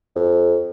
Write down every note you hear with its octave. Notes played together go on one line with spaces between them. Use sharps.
F2